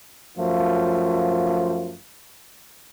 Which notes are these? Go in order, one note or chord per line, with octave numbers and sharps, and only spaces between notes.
F#2 F3 A3 F4